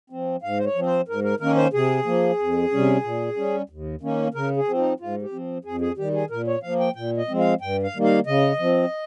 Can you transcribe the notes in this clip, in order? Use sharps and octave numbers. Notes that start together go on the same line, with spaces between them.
F3 C4
G#2 F5
C5
C#5
F3 C4
C5
G#2 A#4
A#4
D#3 A#3 C#4 A#4
C5
C3 G#4
F3 A#3
F2
C3 G3 C#4
A#2
G3 C#4
D#2
D#3 A#3 C#4
C#3 A#4
G#4
F3 C4
D#4
G#2 F4
G4
F3 C4
F2 G#4
G#4
D#3 G3 G4
G#4
A#2 A#4
C#5
F3 A#3 F5
G5
A#2 G5
D#5
F3 G#3 C4
F5
G2 G5
F5
D#3 G3 A#3
F5
C#3 D#5
F3 C4